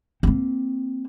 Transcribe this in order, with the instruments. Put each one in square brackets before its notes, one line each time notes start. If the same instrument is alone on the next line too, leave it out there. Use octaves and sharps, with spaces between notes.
[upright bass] A#3 C4